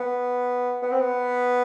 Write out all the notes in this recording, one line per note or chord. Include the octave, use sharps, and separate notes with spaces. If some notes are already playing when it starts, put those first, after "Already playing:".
Already playing: B3
B3
C4
B3